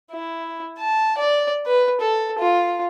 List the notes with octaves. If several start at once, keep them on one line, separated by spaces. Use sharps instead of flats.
E4
A5
D5
B4
A4
F4